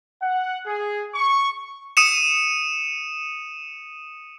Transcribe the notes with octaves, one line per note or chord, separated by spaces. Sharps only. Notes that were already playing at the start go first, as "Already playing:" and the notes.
F#5
G#4
C#6
D#6 C#7 D#7 E7